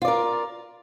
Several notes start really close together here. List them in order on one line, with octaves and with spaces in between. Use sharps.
F4 D5 A#4